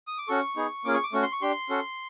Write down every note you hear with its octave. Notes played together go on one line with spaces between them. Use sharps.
D#6
D6
C#4 F#4 A4 C#6
B3 D#4 G#4
A#3 C#4 F4 G#4 D6
C#6
D6
A3 C#4 F#4 C#6
C6
C#6
D4 G4 C6
C#4 F#4 A4